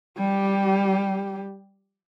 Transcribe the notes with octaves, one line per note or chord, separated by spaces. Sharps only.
G3 G4